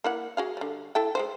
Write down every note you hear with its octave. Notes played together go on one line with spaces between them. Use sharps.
A#3 E4 F#5
F#4 G#4 F5
D3 G3
E4 A4 G5
G#3 A#3 C5